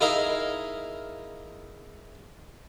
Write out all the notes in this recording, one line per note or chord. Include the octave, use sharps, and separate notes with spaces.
D#4 E4 G#4 A#4 D#5 F5